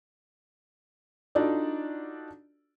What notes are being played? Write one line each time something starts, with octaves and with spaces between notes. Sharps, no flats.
D4 D#4 F4 F#4 A4 D5